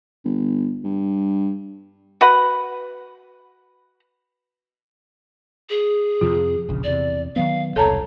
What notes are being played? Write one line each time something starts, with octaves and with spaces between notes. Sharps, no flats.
G1
G2
F#4 B4 F#5
G#4
F2 C3 F3 F4
E1 A#1 C#3
E2 C3 D5
D#3 F#3 B3 F5
E1 C2 A4 C#5 A5 A#5